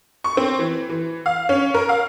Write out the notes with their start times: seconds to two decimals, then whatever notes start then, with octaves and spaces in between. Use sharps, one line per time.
0.24 C#6
0.37 C4
0.59 E3
0.89 E3
1.26 F5
1.49 C#4
1.74 A#4
1.89 F5